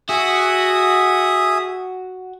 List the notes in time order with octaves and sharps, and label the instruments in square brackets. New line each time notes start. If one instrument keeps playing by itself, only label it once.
[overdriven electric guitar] F#4 [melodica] G#4 E5 D#6